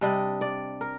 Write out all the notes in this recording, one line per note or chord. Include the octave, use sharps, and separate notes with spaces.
C3 G3 D4 D#5
D5
A#4